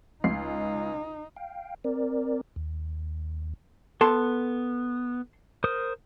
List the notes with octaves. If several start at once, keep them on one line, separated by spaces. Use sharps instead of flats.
C#2 D#4 C7
F5 G5
C4 A#4 D5
D#2
B3 A4 A5 C6
A#4 C5 D#6